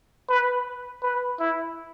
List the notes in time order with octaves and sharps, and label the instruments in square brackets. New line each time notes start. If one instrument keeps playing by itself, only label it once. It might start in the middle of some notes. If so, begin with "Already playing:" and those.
[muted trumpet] B4
B4
E4